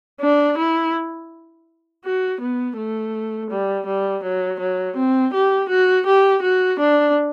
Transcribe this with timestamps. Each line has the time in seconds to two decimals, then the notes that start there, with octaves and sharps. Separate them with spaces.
0.21 D4
0.58 E4
2.05 F#4
2.41 B3
2.77 A3
3.50 G3
3.86 G3
4.23 F#3
4.60 F#3
4.97 C4
5.34 G4
5.69 F#4
6.06 G4
6.42 F#4
6.80 D4